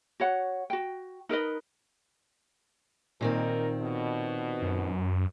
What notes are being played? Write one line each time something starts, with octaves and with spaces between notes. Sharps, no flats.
F#4 C#5 F#5
F#4 G5
D#4 A#4 B4 D#5
A#2 D#3 C4 D#4 A#4
B2
F#2